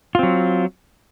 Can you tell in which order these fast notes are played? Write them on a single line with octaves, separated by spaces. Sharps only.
F4 C4 F#3